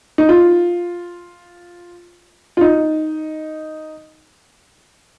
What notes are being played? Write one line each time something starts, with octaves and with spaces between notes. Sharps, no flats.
D#4
F4
F4
D#4